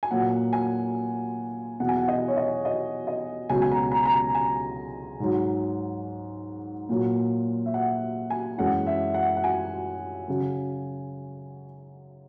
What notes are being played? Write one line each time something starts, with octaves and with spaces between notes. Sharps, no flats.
G#5
A#2 F#3 F#5
G#5
E2 B2 F#3 F#5
G#5
F#5
D#5
C#5
D#5
D#5
D#5
C#2 B2 F#3 G#5
G#5
A#5
A#5
A#5
G#5
G#5
G#2 F#3
A#2 F#3
E5
F#5
G#5
F#2 E3 G#3 F#5
E5
F#5
F#5
G#5
C#3 F#3